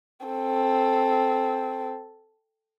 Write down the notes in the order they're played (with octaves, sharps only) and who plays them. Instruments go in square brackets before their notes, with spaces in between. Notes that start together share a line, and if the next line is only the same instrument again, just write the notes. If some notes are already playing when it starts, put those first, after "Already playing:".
[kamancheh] C4 A4